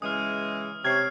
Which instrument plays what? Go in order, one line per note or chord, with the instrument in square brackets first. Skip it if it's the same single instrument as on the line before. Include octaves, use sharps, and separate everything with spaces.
[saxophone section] C#3 E3 G#3 [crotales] D#6 F6
[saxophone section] C3 C#5 [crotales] F6 C7 [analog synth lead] G#6